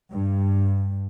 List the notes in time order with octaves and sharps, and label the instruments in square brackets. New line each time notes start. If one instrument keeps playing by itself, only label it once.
[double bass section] G2